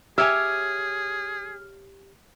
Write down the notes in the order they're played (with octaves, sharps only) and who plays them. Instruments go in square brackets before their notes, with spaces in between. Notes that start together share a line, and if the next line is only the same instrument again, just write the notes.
[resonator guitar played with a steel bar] G4 C#5 G#5 [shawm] G#4 [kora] E5 [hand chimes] F6